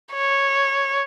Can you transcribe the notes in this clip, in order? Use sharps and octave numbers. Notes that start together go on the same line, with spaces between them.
C#5